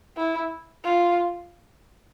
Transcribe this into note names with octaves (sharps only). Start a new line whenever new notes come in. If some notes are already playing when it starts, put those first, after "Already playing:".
E4
F4